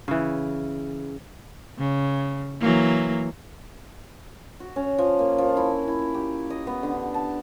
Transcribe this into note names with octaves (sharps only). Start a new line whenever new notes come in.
C#3 E3
C#3
E3 F#3 A#3
F#4
C#4
F3
A#3
F3
E4
E4
G4
D#5
B3
D3
A5